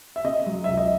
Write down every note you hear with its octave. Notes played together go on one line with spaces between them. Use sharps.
E5
C#3 D#5
F#3
C#2 E5
D#5